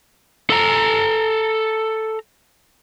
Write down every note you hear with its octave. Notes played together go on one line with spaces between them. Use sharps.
A4 A#5